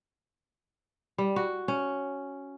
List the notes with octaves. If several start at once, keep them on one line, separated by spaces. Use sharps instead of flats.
G3
F#4
C#4